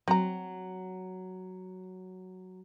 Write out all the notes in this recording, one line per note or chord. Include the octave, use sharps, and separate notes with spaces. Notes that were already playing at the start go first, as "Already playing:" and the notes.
F#3 C4 A#5